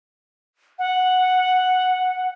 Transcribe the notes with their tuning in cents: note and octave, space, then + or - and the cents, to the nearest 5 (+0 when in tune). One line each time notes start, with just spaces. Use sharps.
F#5 -5